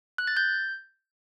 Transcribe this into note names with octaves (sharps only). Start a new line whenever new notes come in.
F#6
A6
G6